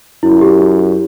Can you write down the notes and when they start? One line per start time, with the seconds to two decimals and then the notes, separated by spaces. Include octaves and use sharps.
0.23 F#2 E4
0.41 G4